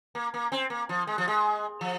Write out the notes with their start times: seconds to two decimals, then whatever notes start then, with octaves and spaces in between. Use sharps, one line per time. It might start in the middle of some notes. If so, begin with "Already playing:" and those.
0.15 A#3
0.34 A#3
0.52 C4
0.70 A#3
0.89 F3
1.07 G#3
1.18 F3
1.28 G#3
1.81 F3